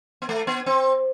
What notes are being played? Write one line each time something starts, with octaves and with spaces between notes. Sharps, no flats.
B3
A3
B3
C4